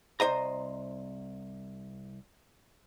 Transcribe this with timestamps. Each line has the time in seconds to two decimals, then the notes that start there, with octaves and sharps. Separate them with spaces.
0.20 C2 C5 D#5 A#5